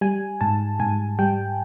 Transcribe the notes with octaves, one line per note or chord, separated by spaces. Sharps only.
G3 G#5
G#2 A5
G#2 G#5
G3 G5